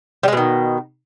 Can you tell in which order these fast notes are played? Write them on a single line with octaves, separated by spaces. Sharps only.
G3 G#3 B2 D#3